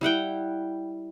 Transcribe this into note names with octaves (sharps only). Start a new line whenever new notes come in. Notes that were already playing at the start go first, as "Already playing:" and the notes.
G3 E4 F#5 G5